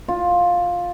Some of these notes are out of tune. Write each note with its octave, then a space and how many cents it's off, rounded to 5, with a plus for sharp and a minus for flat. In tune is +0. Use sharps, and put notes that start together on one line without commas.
F4 +10